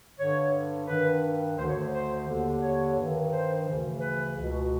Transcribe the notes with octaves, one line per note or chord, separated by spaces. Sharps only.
G2 D3 C#5
G2 D#3 B4
D2 D3 C5
C#5
C5
C5
D#2 D3
C#5
G2 D#3
C5
D2 C#3 E3
B4
C#2 B2